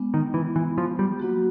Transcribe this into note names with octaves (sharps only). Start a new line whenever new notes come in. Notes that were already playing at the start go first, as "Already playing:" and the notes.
Already playing: G#3 B3 D4
D#3
E3
E3
F3
G3
F#3 A#3 D4 F#4